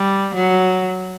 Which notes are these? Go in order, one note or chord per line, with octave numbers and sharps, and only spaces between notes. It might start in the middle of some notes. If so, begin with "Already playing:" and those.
Already playing: G3
F#3